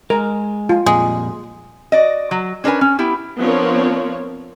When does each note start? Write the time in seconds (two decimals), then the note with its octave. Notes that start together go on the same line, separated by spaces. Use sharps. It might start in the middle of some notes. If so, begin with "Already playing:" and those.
0.10 G#3 A#4
0.69 F4
0.86 F2 A#2 G3 G#3
1.92 F#4 D5 D#5
2.31 F#3
2.64 C#4 D4 A#4 B4 G#5
2.81 C#4
2.99 B3 E4 G4
3.38 F3 B3 C4 D4 A#4 C#5